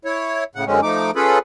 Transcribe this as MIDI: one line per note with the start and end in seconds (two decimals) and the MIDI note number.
0.05 0.44 64
0.05 0.44 73
0.55 0.65 45
0.55 0.65 49
0.55 0.65 78
0.67 0.80 42
0.67 0.80 50
0.67 0.80 56
0.67 0.80 60
0.67 0.80 61
0.83 1.11 53
0.83 1.11 57
0.83 1.11 63
0.83 1.11 86
1.16 1.38 61
1.16 1.38 65
1.16 1.38 68
1.16 1.38 69
1.16 1.38 71
1.16 1.38 83